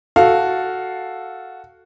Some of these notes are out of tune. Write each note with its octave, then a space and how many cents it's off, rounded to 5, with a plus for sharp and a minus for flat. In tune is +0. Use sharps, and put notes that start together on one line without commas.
F#4 +0 A4 +0 F5 +0